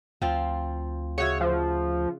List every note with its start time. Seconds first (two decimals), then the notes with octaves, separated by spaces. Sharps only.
0.22 D2 F3 C4 F4
1.18 C#3 F#4 C#5 E5
1.41 F3